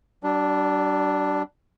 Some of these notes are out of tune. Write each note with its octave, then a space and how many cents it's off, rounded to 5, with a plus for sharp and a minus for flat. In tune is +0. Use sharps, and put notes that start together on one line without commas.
G3 -45 D4 +0